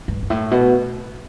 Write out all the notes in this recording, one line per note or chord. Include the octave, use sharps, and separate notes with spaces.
G2
G2
A2
B2